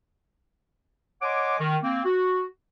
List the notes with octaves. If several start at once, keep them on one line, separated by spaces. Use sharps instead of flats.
C#5 D#5 F#5 G#5 C6 D6
D#3
A#3 C4
F#4